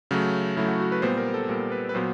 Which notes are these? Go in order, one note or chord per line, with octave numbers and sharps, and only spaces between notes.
C#3 F#3 A3
C#3 F#3 A3 E4
F#4
F#4
B4
A#2 G3 B3 C5
A#4
A4
A#2 G3 B3 A#4
B4
B4
A#2 F#3 B3 C5